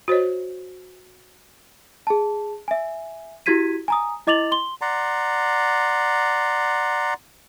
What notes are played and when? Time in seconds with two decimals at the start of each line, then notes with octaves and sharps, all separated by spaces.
0.08 F#4 C5 C#5 D#5
2.07 G#4 A5
2.68 E5 G#5
3.46 E4 F#4 G4 G#6 B6 D#7
3.88 G#5 A#5 D#6
4.27 E4 D#5 D6 A6 F7 F#7
4.52 C6 G7
4.81 D5 F#5 A#5 C6